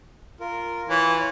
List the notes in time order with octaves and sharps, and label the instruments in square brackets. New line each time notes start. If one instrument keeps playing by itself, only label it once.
[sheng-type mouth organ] F4 A#4
[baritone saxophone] E3 [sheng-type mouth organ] F4 B4 C#5